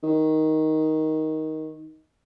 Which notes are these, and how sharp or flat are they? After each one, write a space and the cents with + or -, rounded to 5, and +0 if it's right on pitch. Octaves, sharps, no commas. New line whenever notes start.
D#3 +10